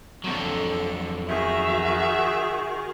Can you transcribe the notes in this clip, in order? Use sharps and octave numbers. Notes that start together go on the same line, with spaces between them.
F2 D3 F#3 A4
D#3 F#4 G#4 E5